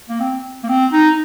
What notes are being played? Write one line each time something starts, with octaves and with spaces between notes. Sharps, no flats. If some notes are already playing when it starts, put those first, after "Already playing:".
A#3
C4
A#3
C4
D#4